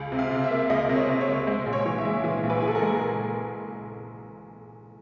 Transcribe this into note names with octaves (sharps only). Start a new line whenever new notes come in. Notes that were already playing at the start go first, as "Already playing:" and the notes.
Already playing: C#2
C3
F5
C3
E5
A#3
C#2 D#5
C3
C#5
C3
C#5
C#2
G#3 C5
A#1
C#5
E3
E5
G#3
E3 F5
A#1
B4
E3 G#4
A4
A#4
G#3